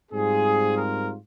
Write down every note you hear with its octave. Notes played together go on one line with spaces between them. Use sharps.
G#2 G3 C4 F4 G#4
A#4